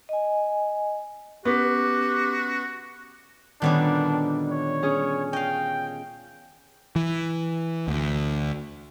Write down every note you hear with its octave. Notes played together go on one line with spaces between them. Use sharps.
D#5 G#5
B3 C#4 F#4 G4
A#2 D3 D#3 G3 B3 C#4 D4
C#5
C#4 G#4
D#5 F5 G5
E3
D2